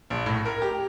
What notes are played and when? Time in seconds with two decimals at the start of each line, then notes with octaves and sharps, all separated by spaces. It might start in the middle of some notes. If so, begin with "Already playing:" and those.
0.10 A#1
0.26 A2
0.45 A#4
0.62 G4